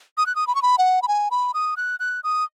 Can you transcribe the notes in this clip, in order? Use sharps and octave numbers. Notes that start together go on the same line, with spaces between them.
D#6
F#6
D#6
B5
C#6
B5
F#5
B5
G#5
B5
D#6
F#6
F#6
D#6